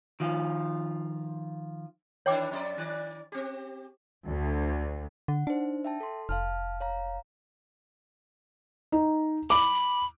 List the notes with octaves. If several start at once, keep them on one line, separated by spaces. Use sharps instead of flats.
D#3 F3 F4
D#3 E3 D4 C#5 G5 D6
F2 E4 D5
D#3 D5
C4 G4
D2
D3 F#5
D4 D#4 C5
E5 G5 A5
A4 C6
F1 F5 A5 F6
C#5 F5 A#5
D#4
B5 D6